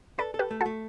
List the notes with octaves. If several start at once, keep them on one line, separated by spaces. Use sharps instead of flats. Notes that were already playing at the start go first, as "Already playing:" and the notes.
A4 B4 D5
A4
G4 B4
A3
F#4 A4
A3